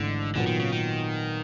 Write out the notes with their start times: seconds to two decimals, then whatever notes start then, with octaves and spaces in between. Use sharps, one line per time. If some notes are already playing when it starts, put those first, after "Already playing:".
Already playing: G#1 G#2 D3 E3 A3
0.35 A#2 D3 F#3 B3
0.47 D#3
0.59 C#3
0.72 D#3